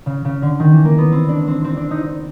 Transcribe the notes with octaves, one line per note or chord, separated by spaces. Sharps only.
C#3
C#3
D3
D#3
E3
A#3
B3
C4
D4
C4
C4
D4
D#4
D#4